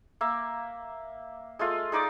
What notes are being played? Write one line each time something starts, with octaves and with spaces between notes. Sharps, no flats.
A#3 E5
G#3 A3 F4
G#3 D#4 D5 D6